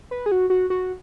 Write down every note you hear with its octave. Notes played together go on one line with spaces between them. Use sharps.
B4
G#4
F#4
F#4
F#4